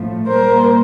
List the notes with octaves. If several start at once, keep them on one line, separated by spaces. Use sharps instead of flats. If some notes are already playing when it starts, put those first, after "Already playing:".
Already playing: A2 F3 A3
A#2 G3 A#3 A#4 C5